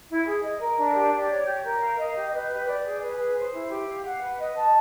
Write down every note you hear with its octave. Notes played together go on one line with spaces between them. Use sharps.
E4
G#4
D#5
A#4
D4
G4
D5
C#5
G4
A#4
F5
D#5
G4
B4
G4
D5
G#4
B4
G#4
C5
E4
G4
F5
F#5
B4
D#5
A5